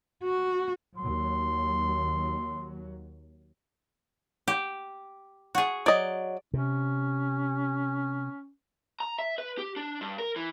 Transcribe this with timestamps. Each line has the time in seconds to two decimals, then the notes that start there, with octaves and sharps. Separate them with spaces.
0.24 F#4
0.98 D#2 F#3 C6
4.48 G4
5.55 F#4 G#4
5.86 F#3 D5 D#5
6.54 C3 C#4
9.00 A#5
9.19 E5
9.38 B4
9.58 G4
9.76 D4
10.01 G2
10.18 A#4
10.36 E3